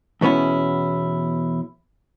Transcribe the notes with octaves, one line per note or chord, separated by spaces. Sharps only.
E2 B2 B3 C#4 E4